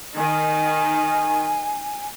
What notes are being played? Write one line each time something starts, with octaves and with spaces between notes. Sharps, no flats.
D#3 G#5